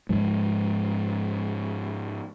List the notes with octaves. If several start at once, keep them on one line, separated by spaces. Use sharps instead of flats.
G#2 F3 G#3